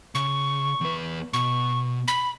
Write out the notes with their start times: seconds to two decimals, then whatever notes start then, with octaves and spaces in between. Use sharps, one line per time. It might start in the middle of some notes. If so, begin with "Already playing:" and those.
0.15 C#3 C#6
0.81 E2 B4
1.33 B2 C#6
2.08 B5